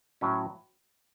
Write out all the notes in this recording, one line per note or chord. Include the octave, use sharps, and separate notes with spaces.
A2 F#3 C#4